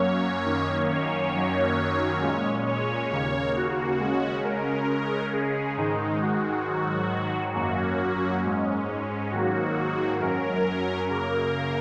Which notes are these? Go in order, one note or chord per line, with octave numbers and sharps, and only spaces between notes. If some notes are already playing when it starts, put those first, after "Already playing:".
Already playing: F#2 F#3 A#3 C#4 C#5
F#2 D#3 A#3 C#4
C#5
F#2 D#3 F#3 A#3 C#4
A#2 G#3 C#4
C#5
D#2 C#3 A#3 C#5
F#4
C#3 G#3 C#4
A#4
C#3 G#3 C#4
G#4
G#2 D#3 G#3 D#4
F#4
G#2 D#3 F#3
F#2 F#3 A#3 C#4 F#4
G#2 G#3 C#4
G#2 D#3 F#3 A#3 F#4
F#2 F#3 C#4 A#4
F#2 C#3 A#3 A#4